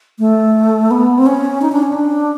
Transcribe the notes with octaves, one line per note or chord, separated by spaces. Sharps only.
A3
B3
C4
C#4
D#4
D4
C#4
D4